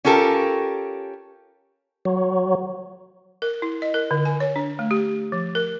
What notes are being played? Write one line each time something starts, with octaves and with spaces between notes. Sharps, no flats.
C#4 F4 G4 A4 A#4
F#3
A#4
E4
D#5
A#4
D3
G#5
C#5
D4
A3
G4
F3
A#4